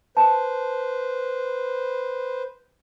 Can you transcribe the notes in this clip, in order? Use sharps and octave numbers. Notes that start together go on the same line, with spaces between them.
B4 C5 A5